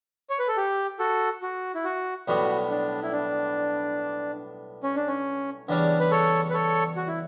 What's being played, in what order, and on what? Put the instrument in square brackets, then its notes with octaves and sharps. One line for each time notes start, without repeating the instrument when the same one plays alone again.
[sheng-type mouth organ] C#5
B4
A4
G4
F#4 A4
F#4
E4
F#4
[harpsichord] B1 A2 G3 B3 [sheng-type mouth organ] F#4
[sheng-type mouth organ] D4
E4
D4
C#4
D4
C#4
[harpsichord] E2 C#3 G3 C#4 [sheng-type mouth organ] D4
[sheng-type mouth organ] B4
A4 C#5
B4
A4 C#5
F#4
E4